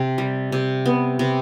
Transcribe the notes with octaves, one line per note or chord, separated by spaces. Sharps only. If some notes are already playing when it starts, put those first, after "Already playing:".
Already playing: C3
G3
C3
B3
C3